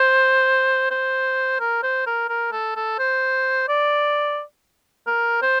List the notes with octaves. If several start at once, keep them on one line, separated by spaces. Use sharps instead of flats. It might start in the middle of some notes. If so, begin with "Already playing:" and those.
Already playing: C5
C5
A#4
C5
A#4
A#4
A4
A4
C5
D5
A#4
C5